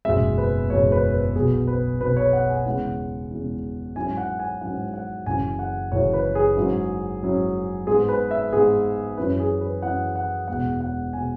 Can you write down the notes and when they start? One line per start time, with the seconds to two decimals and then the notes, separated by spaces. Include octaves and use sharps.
0.05 F#1 E2 B2 G#3 E5
0.38 B4
0.70 F#1 E2 B2 G#3 C#5
0.92 B4
1.14 B4
1.35 B1 B2 B3 G#4
1.67 B4
2.00 B1 B2 B3 B4
2.17 C#5
2.33 F#5
2.49 G#5
2.66 E2 C#3 G#3 E4 F#5
3.31 E2 C#3 G#3 E4
3.96 G#2 F#3 C#4 E4 G#5
4.07 G#5
4.18 F#5
4.39 G#5
4.61 G#2 F#3 C#4 E4 F#5
4.94 F#5
5.26 F#1 F#2 C#3 E3 G#5
5.59 F#5
5.92 F#1 F#2 C#3 E3 C#5
6.13 B4
6.35 G#4
6.57 G#2 F#3 C#4 E4
7.22 G#2 F#3 C#4 E4
7.87 G#2 G#3 B3 G#4
8.09 B4
8.31 E5
8.53 G#2 G#3 B3 G#4
9.17 F#2 E3 C#4 E4 B4
9.40 G#4
9.61 B4
9.82 F#2 E3 C#4 E4 F#5
10.16 F#5
10.48 E1 E2 B2 G#3 F#5
10.80 F#5
11.13 G#5
11.16 B2 G#3